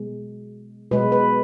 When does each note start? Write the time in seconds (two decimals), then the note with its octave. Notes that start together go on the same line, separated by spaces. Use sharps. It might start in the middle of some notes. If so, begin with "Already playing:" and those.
Already playing: B2 G#3
0.91 B2 G#3 B4
1.12 B4